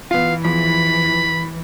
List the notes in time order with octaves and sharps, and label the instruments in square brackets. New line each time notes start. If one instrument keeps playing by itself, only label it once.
[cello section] E3 [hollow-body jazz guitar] B3 F4 [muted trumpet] F5
[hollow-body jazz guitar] E2 F3 [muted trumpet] B5